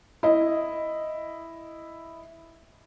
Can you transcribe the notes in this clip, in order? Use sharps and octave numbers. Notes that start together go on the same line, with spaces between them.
E4 D#5